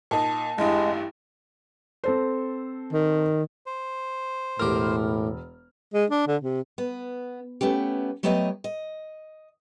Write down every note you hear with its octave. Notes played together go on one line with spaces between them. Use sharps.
A#2 D#4 A5
A1 G2 G#3 E4 G4
C4 A4 C5
D#3
C5
E1 A2 G4 A#4 F6
G#3
D4
D3
C3
B3
A3 B3 C#4 G4
F#3 A3 B3 G4 C#5 D#5
D#5